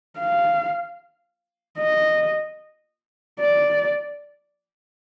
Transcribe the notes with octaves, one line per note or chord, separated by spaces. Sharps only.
F5
D#5
D5